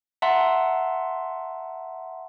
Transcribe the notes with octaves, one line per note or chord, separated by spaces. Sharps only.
E5 F#5 A5 A#5 C6